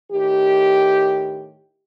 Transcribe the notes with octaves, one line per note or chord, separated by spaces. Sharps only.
A2 D#3 G4